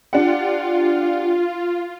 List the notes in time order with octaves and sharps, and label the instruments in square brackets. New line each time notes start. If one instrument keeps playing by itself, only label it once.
[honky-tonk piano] D4 G4 F#5 [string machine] F4